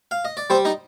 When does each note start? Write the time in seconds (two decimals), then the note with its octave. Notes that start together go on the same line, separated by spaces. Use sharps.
0.11 F5
0.25 D#5
0.37 D5
0.50 G3 C4 C5
0.65 D#4 D#5